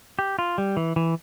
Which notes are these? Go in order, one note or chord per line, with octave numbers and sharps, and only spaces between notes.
G4
F4
G3
E3
E3